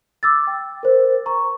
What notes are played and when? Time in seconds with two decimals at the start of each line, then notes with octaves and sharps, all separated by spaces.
0.23 D6 E6 A6
0.47 G5
0.83 A#4 C5
1.26 A#5 C#6